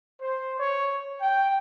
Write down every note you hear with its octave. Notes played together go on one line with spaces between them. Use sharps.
C5
C#5
G5